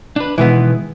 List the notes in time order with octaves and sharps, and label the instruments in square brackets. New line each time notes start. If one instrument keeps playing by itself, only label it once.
[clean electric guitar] D4 B4
[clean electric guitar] B2 D#3 G#3 [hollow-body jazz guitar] E3 B3